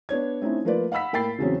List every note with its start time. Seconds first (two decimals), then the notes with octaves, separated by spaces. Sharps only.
0.09 B3 D4 C#5 G#6
0.41 A3 C4 C#4 D#4 E4
0.65 F3 A3 A#3 F4 B4 D5
0.92 F5 F#5 B5 E6 B6
1.13 A2 A#3 G5 B5 A6 C7
1.38 E2 C#3 F#3 C4 C#4